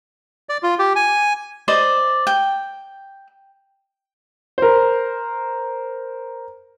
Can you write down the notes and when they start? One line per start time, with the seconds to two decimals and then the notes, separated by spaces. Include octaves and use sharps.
0.49 D5
0.63 F4
0.79 G4
0.96 G#5
1.68 C5 D5 D#5
2.27 G5
4.58 A#4 C5